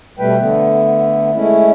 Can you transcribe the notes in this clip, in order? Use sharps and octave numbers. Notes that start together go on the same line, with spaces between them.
B2 G3 A3 B4 G5
D3 A3 B3
G#3 A3 C#4 E4